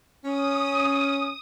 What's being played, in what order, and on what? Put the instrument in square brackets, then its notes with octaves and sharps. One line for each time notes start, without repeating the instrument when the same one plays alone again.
[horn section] C#4 [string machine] D#6